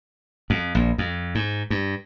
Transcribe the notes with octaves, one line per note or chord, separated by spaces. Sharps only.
F2
A#1
F2
G#2
G2